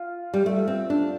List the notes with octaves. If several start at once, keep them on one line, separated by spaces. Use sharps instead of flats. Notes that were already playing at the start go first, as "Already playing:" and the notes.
Already playing: F4
G3
A3
C4
D4